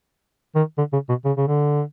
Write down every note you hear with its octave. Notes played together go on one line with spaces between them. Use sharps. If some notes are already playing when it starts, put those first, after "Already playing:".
D#3
D3
C#3
B2
C#3
C#3
D3